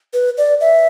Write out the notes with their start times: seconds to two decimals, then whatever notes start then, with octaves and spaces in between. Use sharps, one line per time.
0.14 B4
0.38 D5
0.61 E5